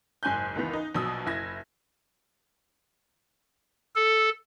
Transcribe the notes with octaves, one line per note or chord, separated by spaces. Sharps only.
F#1 G#2 G#5 F#6 G6
C#2 D#3 E3 B3
D#4
A#1 B2 F#3 D#6 E6
F#1 E4 G#6 A#6
A4